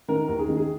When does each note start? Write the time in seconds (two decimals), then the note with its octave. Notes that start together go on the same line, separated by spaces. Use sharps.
0.08 D#3 A#4
0.28 D#2
0.38 G#4
0.48 D#3
0.57 G#4